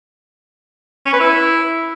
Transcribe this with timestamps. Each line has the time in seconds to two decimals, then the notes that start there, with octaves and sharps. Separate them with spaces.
1.06 C#4
1.13 B4
1.20 E4